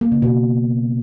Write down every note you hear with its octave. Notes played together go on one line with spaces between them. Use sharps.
A#3
C#3
B2